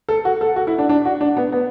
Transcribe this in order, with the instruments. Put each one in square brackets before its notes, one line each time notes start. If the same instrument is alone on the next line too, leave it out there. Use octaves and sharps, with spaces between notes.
[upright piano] A4
F#4
A4
F#4
E4
D4
D4
F#4
D4
B3
B3